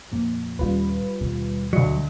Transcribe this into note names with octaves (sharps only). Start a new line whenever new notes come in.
F2 A#2 F3
D#2 A#2 G3 C#4 F4 B4
D#2 B2 C4
D2 F#3 D#5